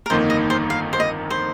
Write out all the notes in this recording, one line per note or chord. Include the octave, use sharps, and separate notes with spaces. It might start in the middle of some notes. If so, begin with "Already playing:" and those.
A#4
G1 F2 D#3 A#3 D#4 C5
D#5
C5
F5
C5
D#5
C5